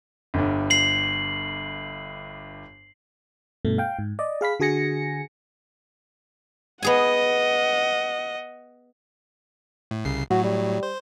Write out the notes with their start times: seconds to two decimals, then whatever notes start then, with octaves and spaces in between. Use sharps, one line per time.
0.34 G1 G2
0.70 C7 F#7
3.65 G2 B2 A3
3.78 F5 G5
3.99 G#2
4.19 D5 D#5
4.41 G#4 F5 B5 B6
4.60 D3 F#4 G#4 G#5 A#6 C#7
6.83 B3 G#4 D#5 F#5 G#5
9.91 A2
10.05 C2 C#3 C7
10.31 A2 F#3 F#4
10.44 G3
10.83 C5